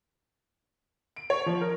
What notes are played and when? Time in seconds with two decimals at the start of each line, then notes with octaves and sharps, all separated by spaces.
1.16 D7
1.30 C#5
1.46 F3
1.61 A#4